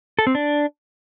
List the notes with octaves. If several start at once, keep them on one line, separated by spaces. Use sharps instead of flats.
A4
C4
D4